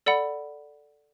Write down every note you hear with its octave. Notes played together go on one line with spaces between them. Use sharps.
A4 D5 F#5 B5